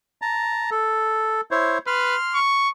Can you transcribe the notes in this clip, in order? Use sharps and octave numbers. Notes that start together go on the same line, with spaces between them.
A5 A#5
A4
E4 C5 C#5
B4 C6 F6
C#6